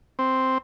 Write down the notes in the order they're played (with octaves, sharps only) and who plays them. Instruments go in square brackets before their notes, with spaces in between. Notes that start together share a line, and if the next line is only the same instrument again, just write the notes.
[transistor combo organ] C4